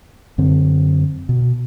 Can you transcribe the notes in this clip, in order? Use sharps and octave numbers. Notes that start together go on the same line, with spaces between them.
F#2 D3 C4
B2